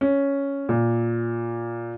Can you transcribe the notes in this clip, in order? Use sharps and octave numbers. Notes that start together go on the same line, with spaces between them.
C#4
A#2